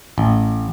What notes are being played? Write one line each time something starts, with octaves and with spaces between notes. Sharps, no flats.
A1